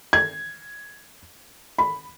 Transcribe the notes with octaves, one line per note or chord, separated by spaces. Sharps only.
G#6
B5